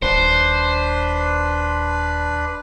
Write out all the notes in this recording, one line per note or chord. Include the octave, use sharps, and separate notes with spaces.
D#1 D4 B4 C5